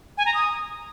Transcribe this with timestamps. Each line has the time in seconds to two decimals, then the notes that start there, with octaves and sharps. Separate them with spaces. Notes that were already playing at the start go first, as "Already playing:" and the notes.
0.18 G#5
0.26 A#5
0.34 D#6